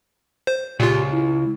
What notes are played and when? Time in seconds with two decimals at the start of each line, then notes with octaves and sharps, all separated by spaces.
0.47 C5
0.80 C#2 A#2 F4 G4
1.12 E4